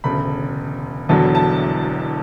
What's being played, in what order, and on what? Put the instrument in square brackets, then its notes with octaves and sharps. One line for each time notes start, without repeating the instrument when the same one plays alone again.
[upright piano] E1 D2 C#3 B5
E1 E2 D3 F#3 A5
A5